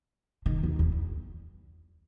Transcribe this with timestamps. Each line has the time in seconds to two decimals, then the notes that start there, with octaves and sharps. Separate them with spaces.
0.46 D#3
0.63 E2
0.79 E2